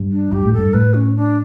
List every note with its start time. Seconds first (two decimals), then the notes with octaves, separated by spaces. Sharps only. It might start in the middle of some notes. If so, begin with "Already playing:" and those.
Already playing: G2
0.11 D4
0.32 G2 G4
0.45 A2
0.53 G2 A4
0.74 A2 B4
0.94 C#4
1.15 D4